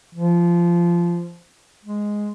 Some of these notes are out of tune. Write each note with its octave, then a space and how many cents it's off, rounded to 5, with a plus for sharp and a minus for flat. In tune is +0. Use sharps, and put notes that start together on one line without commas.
F3 -20
G#3 +0